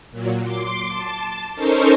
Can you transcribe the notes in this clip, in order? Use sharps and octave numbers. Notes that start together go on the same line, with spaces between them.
A#2 F#3
C6 D6
A5
C#4 D#4 A4 A#4 C5 C#5